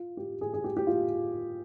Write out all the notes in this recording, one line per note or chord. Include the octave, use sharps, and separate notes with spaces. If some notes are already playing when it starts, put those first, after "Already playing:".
Already playing: F4
G4
G#4
G#4
G4
G4
F4